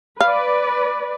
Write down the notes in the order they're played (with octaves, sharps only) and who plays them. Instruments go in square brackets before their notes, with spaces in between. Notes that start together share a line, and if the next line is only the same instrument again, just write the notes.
[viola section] B4 D5 [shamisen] F5